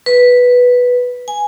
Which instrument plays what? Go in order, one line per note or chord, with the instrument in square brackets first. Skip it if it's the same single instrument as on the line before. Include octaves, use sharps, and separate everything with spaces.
[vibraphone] B4
G#5